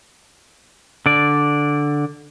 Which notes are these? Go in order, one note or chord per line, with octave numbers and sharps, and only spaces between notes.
D3 D5